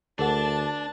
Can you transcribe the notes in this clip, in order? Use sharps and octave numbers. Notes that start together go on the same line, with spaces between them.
D2 D4 G#4 A#4 F#5 A5